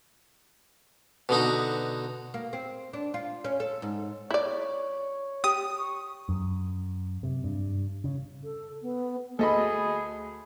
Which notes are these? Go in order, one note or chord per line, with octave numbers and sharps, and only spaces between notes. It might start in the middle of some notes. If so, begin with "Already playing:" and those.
B2 D3 D#4 F#4
A#3
C4
D4
F4
C#4
A4
G#2
E4 C#5 D5
G4 D#6
C#6
F#2
C3
G2
C#3
A4
B3
D2 G#4 A4 D#5 B5